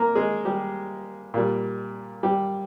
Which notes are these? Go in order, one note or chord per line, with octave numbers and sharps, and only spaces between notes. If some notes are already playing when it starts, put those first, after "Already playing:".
Already playing: A#3 A#4
G#3 G#4
G3 G4
A#2 G3
G3 G4